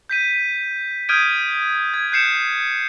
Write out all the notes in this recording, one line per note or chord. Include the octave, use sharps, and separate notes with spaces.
G6 B6 D#7
D#6 F6 G6 G#6 D7 D#7
G#6
F#6 G6 C7 C#7 E7